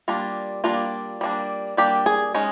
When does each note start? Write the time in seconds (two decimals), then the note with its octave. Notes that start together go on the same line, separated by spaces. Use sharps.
0.08 G3 A#3 D4 F4
0.64 G3 A#3 D4 F4
1.21 G3 A#3 D4
1.77 G3 A#3 D4 G4
2.06 G#4
2.35 G#3 C#4 D#4